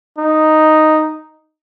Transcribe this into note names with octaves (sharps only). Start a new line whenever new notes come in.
D#4